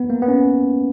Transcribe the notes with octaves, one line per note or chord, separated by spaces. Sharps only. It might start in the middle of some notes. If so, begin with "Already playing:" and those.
Already playing: B3
A#3
B3
C#4